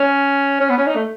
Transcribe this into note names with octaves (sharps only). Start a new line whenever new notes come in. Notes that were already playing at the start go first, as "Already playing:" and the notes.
Already playing: C#4
C#4
B3
C#4
D#4
A3